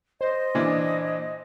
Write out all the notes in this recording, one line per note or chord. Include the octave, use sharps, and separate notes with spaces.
C5 D#5
A#2 E3 D4